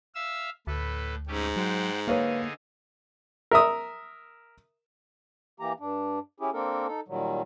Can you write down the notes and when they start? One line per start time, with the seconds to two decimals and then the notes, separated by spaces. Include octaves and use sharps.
0.15 E5 F5 E6
0.67 D2 A2 A4 B4
1.27 G#2 A3 C#4 G4
1.56 F#3 C5 F#5 G5
2.08 D3 A#3 D#4 G#4 B4 C#5 F5
3.51 A#4 E5 D#6
5.60 E3 A#3 G4 A#5
5.80 G2 D4
6.40 C#4 E4 G4 G#4
6.53 A#3 C4 D4 A4 A#4
6.87 D#4 A4
7.08 A#2 D#3 F#3 G3